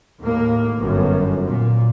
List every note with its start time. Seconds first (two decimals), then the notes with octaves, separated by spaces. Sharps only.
0.20 D#2 A2 A#3
0.80 G1 F#2
1.46 A#2